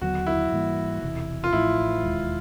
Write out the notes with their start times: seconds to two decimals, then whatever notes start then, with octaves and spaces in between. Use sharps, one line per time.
0.01 D#2 D3 F#3 B3 F#4
0.26 E4
0.52 G#2 E3 G3 A#3
1.03 E1 E2 C3
1.44 F4
1.53 A1 A2 F3 E4
2.03 E1 D#2 D#3 G#3